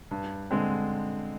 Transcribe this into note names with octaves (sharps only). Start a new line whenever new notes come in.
G2
D3 G#3 C4